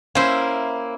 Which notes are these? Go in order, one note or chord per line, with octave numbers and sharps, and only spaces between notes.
A#3 C#4 E4 C5